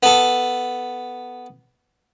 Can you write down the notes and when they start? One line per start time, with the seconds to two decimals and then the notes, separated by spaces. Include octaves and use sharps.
0.03 B3 A4